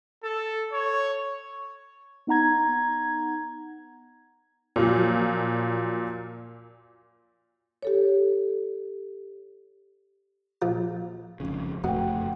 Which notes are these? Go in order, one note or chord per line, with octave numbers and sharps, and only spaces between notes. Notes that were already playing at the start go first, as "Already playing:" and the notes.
A4
C#5
B3 D#4 F#5 A#5 G#6
A#2 F3 F#3
G4 A4 C#5
A#1 F3
G#1 F2 C#3
F#1 F2 B2 A3 F#5 G5